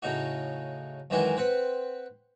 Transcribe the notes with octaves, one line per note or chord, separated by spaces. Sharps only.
A2 C#3 D#4 F#4
F#2 D#3 E3 G#3 E4 F#4
C4 B4 F#5